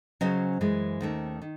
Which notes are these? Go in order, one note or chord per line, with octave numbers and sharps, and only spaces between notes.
C#3 F#3 C#4 C5 D#5
F#2 E3 G#3
D#2 D#3 A3 C#4
D#3